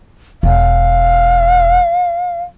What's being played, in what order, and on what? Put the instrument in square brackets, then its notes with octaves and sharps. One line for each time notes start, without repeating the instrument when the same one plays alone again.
[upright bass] E1 [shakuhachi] F5